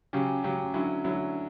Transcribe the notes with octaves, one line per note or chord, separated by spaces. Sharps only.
C#3 F#3 C#4 G4
C#3 F#3 C#4 G4
D3 F#3 C#4 E4
D3 F#3 C#4 E4